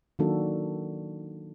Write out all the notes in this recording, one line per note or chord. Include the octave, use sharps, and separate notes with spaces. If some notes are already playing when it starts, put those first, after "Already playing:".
D#3 F#3 A#3 D4 F#4 A4